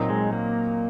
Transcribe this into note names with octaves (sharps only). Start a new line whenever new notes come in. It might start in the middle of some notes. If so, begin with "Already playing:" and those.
Already playing: A#2 F#3 C4 D#4
G#3
A#3